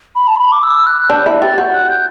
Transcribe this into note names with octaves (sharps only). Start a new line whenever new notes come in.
B5
A5
C6
B5
D6
E6
F#6
D4 G6
E4
G4 A6
F#4 G6
F#6
G6